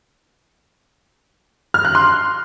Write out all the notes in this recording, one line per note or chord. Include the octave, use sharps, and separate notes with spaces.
F6
F#6
C6